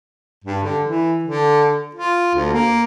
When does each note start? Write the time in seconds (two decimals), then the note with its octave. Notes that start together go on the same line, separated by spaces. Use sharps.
0.44 G2
0.63 D3
0.84 E3
1.24 D3
1.95 F4
2.35 D2
2.53 A#3